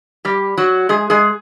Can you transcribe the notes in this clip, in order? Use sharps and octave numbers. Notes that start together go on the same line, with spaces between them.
G3 G4
F#3 F#4
G#3 G#4
G#3 G#4